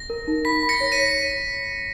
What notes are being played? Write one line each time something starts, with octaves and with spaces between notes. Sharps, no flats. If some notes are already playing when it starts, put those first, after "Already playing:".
Already playing: A#6
A#4
D#4
B5 B6
B5
A#6 C#7
C#5
B6 D#7
C#5